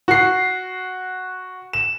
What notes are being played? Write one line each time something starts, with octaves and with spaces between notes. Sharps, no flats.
F#4 C7
E7